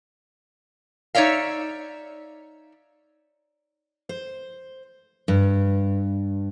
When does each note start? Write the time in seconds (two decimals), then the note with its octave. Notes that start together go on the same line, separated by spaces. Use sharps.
1.15 D#4 C#5 D5 E5 F5
4.09 C5
5.28 G2